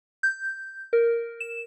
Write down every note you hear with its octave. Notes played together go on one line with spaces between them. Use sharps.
G6
A#4
E7